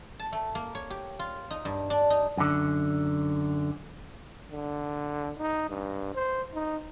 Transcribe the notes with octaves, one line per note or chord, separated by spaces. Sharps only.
A5
A3
A#3
C#5
G4
F4
D#4
G2
D4
D#4
F#2 D3
D3
D#4
G2
C5
D#4